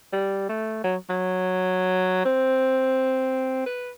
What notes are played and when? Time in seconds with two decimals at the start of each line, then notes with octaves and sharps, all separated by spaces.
0.13 G3
0.49 A3
0.84 F#3
1.10 F#3
2.25 C4
3.66 B4